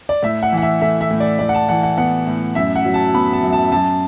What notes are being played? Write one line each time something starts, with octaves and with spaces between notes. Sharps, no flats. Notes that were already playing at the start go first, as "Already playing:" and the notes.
D5
A2 E5
F#5
E3
F#5
E5
A3 E5
E5
A2
D5
A2 D5
F#5
A5
E3 F#5
F#5
B3 F#5
A2
F#2 E5
F#5
F#3
A5
B3 B5
A5
F#2
A5
F#2 A5